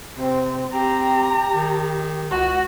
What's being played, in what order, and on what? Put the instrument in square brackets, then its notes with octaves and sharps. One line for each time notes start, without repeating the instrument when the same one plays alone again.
[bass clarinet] C3 [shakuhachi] C4
[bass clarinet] C4 [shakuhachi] G4 [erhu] A#5
[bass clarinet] D#3
[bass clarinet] C#2 [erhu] F#4